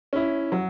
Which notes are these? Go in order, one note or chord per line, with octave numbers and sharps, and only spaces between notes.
C#4 E4
F#3